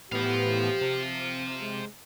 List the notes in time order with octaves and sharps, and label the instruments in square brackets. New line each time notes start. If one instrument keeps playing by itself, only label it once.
[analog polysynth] A2 E3 B3 [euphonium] G4 [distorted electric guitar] C5 F5
[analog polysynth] C3
[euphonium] G#3